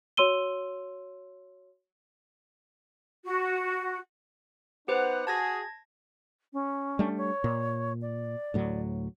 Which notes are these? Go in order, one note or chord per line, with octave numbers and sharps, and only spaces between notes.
F#4 C#5 C6 E6 D#7 G7
F#4
B3 D#4 G4 B4 C5 F#5
F#4 G#4 A5 G#6 A#6
C#4
G3 A3 D4
C#5
A#2
D5
D2 A2 F#3